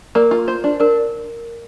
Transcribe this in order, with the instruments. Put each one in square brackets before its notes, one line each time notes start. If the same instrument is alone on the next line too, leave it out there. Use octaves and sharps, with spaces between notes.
[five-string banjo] A#3 [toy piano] A#4 D5
[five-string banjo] F4
C5
D4
[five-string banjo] D4 [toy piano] A#4